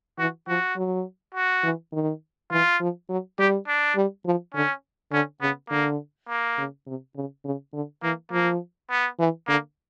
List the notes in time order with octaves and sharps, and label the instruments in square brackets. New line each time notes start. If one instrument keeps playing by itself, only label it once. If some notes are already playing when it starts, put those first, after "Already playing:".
[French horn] E3 [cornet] F#4
[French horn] F3 [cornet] F#4
[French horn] F#3
[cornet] F#4
[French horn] E3
D#3
[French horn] E3 [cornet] F4
[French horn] F3
F#3
[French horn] G3 [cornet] G4
[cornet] D4
[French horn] G3
F3
[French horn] D3 [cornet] C#4
[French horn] D3 [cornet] C#4
[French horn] C#3 [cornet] B3
[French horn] D3 [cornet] A#3
[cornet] A#3
[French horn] C#3
C3
C#3
C#3
D3
[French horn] E3 [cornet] A#3
[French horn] F3 [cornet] A#3
[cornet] B3
[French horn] E3
[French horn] D3 [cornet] A#3